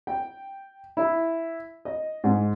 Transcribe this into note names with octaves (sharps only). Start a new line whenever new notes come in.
G5
E4
D#5
G#2